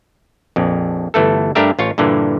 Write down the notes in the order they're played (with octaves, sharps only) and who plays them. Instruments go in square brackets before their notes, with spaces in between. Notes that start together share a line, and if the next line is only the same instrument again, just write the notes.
[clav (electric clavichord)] A#1 F2
G1 E3 A3 A4
G2 A3 D4 G4 A#4 E5
A1 F4 C#5
G2 A#2 D3 E3